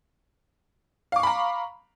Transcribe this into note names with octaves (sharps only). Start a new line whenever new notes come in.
F5 A#5 B5 C#6 D6